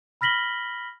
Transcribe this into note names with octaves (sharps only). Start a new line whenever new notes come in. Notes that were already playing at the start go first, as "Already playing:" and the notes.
B5 F6 A#6 B6 F#7 G7